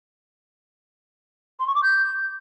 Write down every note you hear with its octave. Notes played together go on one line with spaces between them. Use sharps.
C6
C#6
D6
G6